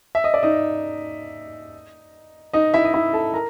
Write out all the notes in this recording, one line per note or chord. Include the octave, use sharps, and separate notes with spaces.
E5
D#5
D5
D#4 D#5
D#4 D#5
E4 E5
D#5
E4 E5
A4 A5
A#4 A#5